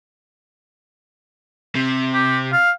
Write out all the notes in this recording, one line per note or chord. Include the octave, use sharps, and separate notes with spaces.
C3
G4
F5